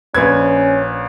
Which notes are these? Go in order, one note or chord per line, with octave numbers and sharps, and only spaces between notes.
A#1 C#4 B4 G#6